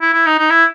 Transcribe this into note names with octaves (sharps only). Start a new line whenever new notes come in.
E4
E4
D#4
D#4
E4